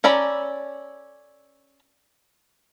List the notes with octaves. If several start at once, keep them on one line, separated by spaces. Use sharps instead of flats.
C#4 A4 D5 A#5 B5